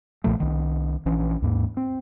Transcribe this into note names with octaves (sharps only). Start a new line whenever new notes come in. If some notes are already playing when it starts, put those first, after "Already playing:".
B1 A#2 F3 A3
C2 D#3
A#1 E3 C#4 D4
D#2 G#2 A#3
C4